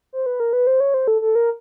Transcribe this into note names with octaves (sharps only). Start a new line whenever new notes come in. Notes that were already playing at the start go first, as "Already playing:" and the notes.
C5
B4
A#4
B4
C5
C#5
C5
A4
A4
A#4